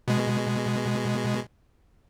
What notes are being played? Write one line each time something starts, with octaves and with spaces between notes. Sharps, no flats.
B2 G#3